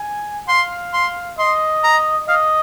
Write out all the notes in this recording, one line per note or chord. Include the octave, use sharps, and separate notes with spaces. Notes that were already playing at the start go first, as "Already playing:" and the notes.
Already playing: G#5
F5 C6
C6
D#5 C6
A#5
D#5 F5